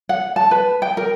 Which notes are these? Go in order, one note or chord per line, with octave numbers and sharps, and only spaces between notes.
F#5
A5
B4
G5
A#4